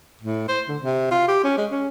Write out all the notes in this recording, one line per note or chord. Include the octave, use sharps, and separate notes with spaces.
A2
C5
D3
C3
F4
G4
C#4
G#3
C#4